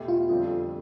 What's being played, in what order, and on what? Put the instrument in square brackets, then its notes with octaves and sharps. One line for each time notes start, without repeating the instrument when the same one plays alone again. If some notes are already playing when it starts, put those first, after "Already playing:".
Already playing: [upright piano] E2 B2 A3 E4 G4
[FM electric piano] F4
[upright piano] F2 D3 G3 C4